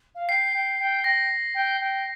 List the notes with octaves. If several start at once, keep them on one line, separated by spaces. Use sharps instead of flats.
F5
G5 C7
G5
G5
G5 A#6
G5
G5